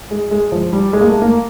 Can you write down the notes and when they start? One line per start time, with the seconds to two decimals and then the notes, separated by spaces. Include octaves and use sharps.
0.11 G#3
0.31 G#3
0.52 F3
0.73 G3
0.93 G#3
1.01 A#3
1.08 A3
1.22 A#3